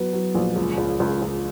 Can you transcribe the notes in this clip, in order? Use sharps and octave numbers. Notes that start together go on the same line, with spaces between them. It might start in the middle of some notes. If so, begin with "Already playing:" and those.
Already playing: F#3 B3
F#3
A#1
C#2
C#2
C#2
C#2